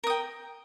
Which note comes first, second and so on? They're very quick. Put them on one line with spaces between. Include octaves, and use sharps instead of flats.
A#4 D#6 G5